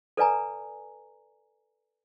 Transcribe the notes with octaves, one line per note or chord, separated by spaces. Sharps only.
A4 B4 D5 G#5 A#5